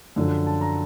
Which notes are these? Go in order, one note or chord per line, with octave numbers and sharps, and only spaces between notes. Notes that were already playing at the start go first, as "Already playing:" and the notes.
F#2 D3 F3
A5
A#5